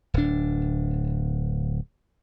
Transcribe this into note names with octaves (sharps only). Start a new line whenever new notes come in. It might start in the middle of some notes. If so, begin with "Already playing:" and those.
D1 D4